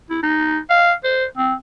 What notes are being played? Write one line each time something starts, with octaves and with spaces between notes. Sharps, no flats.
E4
D#4
F5
C5
C4